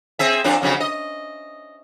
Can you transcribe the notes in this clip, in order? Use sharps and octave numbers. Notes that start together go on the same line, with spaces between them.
C4 G#4 E5
F2 D4 F4
F2 C#3 F#3
D#5